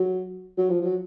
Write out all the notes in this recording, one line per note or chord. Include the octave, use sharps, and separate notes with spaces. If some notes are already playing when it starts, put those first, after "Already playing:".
Already playing: F#3
F#3
F3
F3
F#3